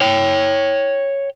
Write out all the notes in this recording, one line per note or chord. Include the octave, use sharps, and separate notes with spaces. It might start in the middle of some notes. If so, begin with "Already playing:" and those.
C#5 G5